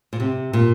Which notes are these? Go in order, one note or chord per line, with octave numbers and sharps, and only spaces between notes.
A#2
C3
A#2